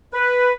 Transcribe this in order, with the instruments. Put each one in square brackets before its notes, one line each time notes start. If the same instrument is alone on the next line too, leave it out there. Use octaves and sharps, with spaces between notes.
[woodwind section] B4